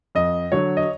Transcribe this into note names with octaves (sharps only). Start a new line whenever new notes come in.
F2 D#5
D3 F#3 C#5
D#5